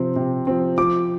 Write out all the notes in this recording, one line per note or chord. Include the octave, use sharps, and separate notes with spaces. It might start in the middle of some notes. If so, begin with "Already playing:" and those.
Already playing: C3 F3 C4 C6
C3
F3 C4
F3 D6